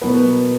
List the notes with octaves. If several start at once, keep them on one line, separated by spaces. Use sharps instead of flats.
B2 F#3 A#3 B3 B4